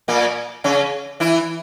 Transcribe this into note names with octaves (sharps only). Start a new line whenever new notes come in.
A#2 A#3
C#3 C#4
E3 E4